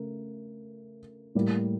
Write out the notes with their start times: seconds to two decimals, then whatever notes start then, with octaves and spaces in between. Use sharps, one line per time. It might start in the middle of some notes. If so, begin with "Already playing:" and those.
Already playing: C#3 A3 A#4
1.35 A2 G3 A#3